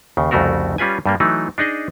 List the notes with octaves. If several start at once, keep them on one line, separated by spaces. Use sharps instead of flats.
D#2 C#3
C2 F2 C#3 A3 F#4 A#4
G3 C#4 F4 B4 G#5
G2 G3 A#3
E3 F#3 A3 D#4
D4 D#4 G#4 D#5